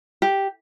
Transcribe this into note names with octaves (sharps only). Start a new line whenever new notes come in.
G4